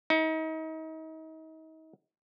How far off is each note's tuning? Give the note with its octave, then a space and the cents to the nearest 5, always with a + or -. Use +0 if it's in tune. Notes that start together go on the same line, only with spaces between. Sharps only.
D#4 +35